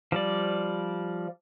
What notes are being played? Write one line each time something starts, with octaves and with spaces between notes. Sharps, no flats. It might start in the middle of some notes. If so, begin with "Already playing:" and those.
F3 G3 D5